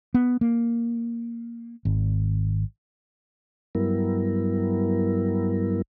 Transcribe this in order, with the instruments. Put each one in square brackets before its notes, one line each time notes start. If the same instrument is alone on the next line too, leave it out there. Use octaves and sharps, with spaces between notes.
[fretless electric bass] B3
A#3
G#1
[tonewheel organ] G2 F#3 G3 B3 E4 A#4